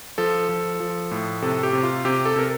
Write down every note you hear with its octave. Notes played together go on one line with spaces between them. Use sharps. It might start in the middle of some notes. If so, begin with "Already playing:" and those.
F3 A4
F3
F3
A2
C3 A4
G4
C3
F4
C3 G4
A4
C3 A#4